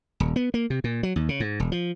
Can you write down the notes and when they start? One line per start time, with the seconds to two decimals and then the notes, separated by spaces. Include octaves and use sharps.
0.20 D#1
0.36 B3
0.54 A#3
0.70 C3
0.84 A#2
1.03 F#3
1.16 D#2
1.29 C#3
1.40 G#2
1.60 E1
1.72 F3